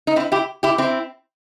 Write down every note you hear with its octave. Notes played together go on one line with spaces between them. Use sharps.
D#4
C4 E4
E4 G4
E4 G4
C4 E4